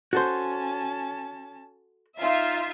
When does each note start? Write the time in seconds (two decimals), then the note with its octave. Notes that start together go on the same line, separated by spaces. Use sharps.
0.13 C#4 F#4 A4 C5 A5
2.18 D#4 F4 E5 F5